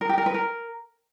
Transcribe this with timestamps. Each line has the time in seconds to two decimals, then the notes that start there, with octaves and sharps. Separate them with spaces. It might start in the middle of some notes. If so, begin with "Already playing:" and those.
0.01 A#4
0.09 G4
0.18 A#4
0.26 B4
0.34 A#4